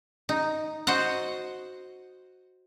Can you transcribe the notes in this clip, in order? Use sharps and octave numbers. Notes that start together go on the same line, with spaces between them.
D#4
F#4 C5 D#5 F#5